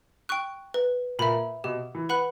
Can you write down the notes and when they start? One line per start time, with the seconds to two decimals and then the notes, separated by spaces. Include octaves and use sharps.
0.29 G5 C#6 F#6
0.74 B4
1.19 A#2 E5 B5
1.64 B2 G4
1.95 E3
2.09 B4 F#5 B5 F#6